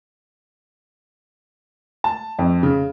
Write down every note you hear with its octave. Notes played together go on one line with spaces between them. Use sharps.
A5
F2
C#3